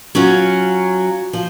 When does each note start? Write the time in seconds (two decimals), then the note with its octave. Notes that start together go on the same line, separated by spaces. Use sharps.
0.15 F#3 C#4 F4
1.33 F3